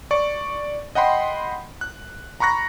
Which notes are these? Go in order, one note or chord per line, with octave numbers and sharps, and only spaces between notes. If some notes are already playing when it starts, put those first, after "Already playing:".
D5 C#6
D#5 F#5 G5 B5 C6
F#6
A#5 B5 C#6 F#6 A#6